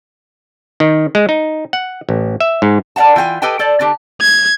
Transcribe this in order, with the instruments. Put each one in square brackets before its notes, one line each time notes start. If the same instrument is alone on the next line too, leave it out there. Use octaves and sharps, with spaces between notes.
[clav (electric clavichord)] D#3
G#3
D#4
F#5
A1
E5
G#2
[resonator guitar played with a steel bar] A#4 D5 F5 F#5 A5
E3 F4 G5 G#5
G4 A4 B4 D#5 G5 G#5
A4 C5 D5
D3 D4 G4
[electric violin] G#6